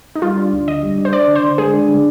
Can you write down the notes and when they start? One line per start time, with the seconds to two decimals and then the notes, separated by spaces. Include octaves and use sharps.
0.15 D#4
0.22 G3 F4
0.38 D4
0.53 D2
0.68 D3 D#5
0.83 G3
0.98 D4
1.05 C5
1.13 D4 D5
1.28 D3
1.35 C5
1.44 D3
1.58 G#3 G#4
1.74 D4
1.88 D3